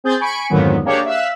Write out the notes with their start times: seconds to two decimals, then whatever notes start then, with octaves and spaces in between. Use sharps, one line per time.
0.04 C4 G#4 G6 A6
0.20 G#5 B5 C#6 D7
0.50 F2 G#2 D3 D#3 F#3 B3
0.85 A#3 D4 G4 G#4 C#5 D5
1.05 E5 F5 E6 F#6